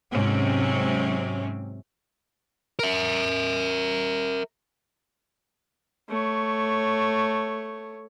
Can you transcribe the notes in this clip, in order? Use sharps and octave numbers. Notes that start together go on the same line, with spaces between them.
G#2 C3 F#3 C4 C#4
A#4 E5
A3 C#5